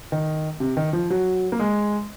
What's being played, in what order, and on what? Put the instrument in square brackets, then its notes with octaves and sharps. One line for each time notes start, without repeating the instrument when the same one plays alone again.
[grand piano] D#3
C3
D#3
F3
F#3
A#3
G#3